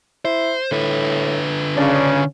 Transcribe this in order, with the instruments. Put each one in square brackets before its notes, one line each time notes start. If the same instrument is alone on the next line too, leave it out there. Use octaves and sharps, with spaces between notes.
[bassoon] E4 [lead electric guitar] C5
[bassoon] A2 [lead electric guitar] D3 B4
[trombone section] C#3 C#4 [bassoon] D4